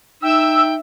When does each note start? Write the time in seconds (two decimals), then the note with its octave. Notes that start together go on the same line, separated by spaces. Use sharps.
0.22 D#4 E5 G5 E6